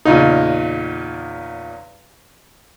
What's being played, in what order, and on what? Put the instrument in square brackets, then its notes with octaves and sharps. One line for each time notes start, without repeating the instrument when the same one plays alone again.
[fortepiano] E2 A#2 C#3 D#4